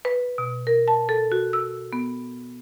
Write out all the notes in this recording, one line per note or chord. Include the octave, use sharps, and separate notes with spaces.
B4
B2
A#4
A5
A4
F#4
E6
B3